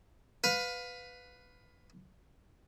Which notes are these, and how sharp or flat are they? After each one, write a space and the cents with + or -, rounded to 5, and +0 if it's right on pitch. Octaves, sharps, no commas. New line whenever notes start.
B4 +10 F5 +25